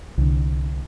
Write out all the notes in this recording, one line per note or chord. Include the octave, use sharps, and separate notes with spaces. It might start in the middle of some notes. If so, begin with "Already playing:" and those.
C2 D3